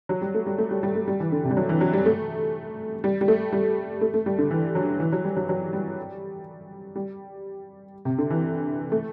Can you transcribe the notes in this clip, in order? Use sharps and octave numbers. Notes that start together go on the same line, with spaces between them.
F#3
G3
A3
G3
A3
G3
G3
A3
G3
E3
D3
C3
G3
F#3
E3
F#3
G3
A3
G3
G3
A3
G3
A3
A3
G3
D3
E3
F#3
E3
F#3
G3
F#3
F#3
G3
G3
C3
D3
E3
A3